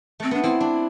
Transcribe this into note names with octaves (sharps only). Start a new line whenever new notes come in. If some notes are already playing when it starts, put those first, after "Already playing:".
A3 C4
B3 D4
C4 E4
D4